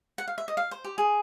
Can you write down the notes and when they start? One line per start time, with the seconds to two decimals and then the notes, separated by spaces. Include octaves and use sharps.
0.18 F#5
0.28 F5
0.38 E5
0.48 D#5
0.57 F5
0.71 C5
0.84 G4
0.98 G#4